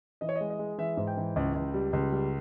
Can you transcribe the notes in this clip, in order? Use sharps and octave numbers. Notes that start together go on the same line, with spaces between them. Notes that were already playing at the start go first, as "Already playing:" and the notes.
E3 D#5
C#5
D#5
G#3
D#5
G#3
E3 E5
G#2
G5
E3
C#2
C#2
G3
C#2
G3